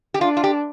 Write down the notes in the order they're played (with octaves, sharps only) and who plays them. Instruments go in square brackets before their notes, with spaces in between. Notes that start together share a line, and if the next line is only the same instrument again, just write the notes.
[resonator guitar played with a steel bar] G4
[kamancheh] D4 [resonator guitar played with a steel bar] F4
[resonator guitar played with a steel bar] F4
G4